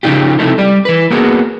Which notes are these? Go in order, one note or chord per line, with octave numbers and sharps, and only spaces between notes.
C#3 F3 D#4 F4 G4
C3 F3 A3 D#4 E4 A4
G3 D5
E3 B4
A#3 B3 F#4 G#4